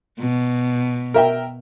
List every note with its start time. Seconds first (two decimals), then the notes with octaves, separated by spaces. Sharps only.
0.20 B2
1.14 A#4 E5 G5